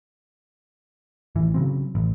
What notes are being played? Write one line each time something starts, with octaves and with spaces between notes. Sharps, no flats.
A1 E3
C#3 F#3 C4
A1